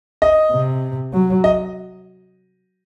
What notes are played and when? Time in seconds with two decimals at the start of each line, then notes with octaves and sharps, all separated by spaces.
0.22 D#5
0.52 C3
1.13 F#3
1.44 D#5